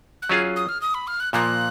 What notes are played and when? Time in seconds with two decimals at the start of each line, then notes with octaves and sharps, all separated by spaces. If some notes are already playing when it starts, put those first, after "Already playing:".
0.22 F#6
0.29 F#3 C#4 F4 G#4 G#6
0.56 D#6
0.69 F6
0.81 D#6
0.94 B5
1.07 F6
1.20 F#6
1.33 A#2 F3 A#3 F#6